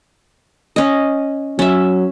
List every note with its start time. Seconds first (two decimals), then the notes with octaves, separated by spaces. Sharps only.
0.76 C#4 D#5
1.59 F#3 C#4 E5